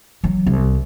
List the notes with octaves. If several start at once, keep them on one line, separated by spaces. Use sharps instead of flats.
E3 F#3
C2